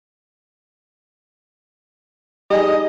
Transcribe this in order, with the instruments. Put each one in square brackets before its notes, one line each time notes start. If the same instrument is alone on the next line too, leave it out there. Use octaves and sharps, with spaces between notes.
[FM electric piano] G3 D#4 G#4 [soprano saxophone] D#5